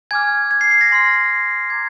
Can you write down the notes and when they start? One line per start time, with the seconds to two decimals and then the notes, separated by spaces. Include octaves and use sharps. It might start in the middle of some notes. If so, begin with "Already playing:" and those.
0.11 G#5 D6 F6 G#6
0.51 G#6
0.61 C7
0.71 C7
0.81 A#6
0.91 G#5 C6 F6
1.70 A#5 D6 F6 G#6